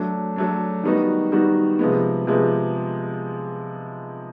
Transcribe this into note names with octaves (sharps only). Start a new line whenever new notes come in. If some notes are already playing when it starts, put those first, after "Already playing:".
Already playing: F#3 A3 D4
F#3 A3 D4
D#3 G3 B3 D#4 F#4
D#3 G3 B3 D#4 F#4
C3 F3 G#3 B3
C3 F3 G#3 B3